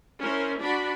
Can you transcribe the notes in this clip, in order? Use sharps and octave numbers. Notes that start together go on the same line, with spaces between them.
C#4 E4 A#4 C5
D4 F#4 D5 B5